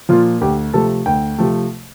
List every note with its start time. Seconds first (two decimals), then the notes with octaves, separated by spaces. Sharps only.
0.09 A#2 F3 F4
0.41 D2 G4
0.73 C3 F3 A3 A4
1.06 D2 G5
1.38 C3 F3 A3